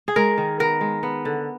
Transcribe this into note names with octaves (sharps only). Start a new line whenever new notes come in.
G#4
G#3 A#4
D#3
B3 A#4
G#3
B3
D3